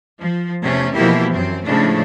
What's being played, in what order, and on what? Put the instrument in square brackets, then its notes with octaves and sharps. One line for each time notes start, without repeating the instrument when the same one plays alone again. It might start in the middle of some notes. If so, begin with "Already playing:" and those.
[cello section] F3
E2 C3 A3 C#4
B2 E3 F3 A#3 E4 G4
F#2 C4
A2 C#3 F3 G#3 A3 D4